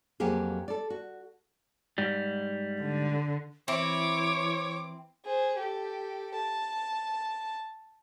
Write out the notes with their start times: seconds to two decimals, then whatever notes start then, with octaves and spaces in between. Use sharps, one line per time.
0.20 F2 F#3 A#3 G4 G#4
0.68 A4 D5
0.90 F#4
1.98 G#2 G3
2.81 D3
3.68 E3 C4 E4 C#5 D6
5.25 G#4 C5
5.58 G4 A4
6.34 A5